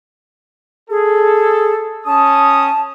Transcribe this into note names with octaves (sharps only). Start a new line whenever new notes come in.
G#4 A4
C#4 A5 D#6